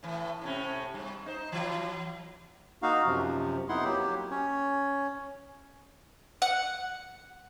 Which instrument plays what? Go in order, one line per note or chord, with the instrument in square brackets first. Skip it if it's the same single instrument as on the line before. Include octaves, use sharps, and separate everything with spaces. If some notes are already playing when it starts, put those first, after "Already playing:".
[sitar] A2 E3
A2 C3 C#4
G2
D#4 C5
E3 F#3
[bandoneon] A#3 D#4 F#4 F5
F#2 C3 F3
F2 B3 D#4 E4 F#5 C6
F#3 A#3 G4
C#4 C#5
[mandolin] F#5